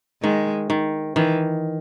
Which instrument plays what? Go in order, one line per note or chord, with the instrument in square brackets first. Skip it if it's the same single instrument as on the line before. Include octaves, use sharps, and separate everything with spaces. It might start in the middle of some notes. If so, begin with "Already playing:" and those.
[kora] D#3 [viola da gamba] G#3
[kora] D#3
[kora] D#3 [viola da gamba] E3